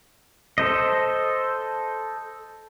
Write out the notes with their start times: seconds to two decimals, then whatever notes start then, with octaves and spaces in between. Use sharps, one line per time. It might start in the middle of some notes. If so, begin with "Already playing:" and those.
0.58 A4 C5 D#5